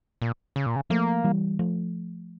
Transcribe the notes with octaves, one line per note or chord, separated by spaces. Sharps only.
A#2
C#3
A#2
C#3
F3 A3 A#3
E3 G3
F3 A3